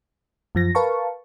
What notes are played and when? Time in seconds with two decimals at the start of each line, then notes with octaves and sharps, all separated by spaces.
0.55 F#2 F3 A#6
0.75 A#4 B4 F5 A5 C#6